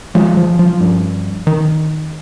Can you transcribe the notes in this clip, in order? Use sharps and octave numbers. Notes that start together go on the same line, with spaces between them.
F3 G#3
F3
F3
G2
D#3